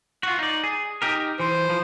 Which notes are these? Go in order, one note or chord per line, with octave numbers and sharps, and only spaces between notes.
F4 F#4
D#4 D5
G#4
D#4 G4 A#4
E3 C5
F3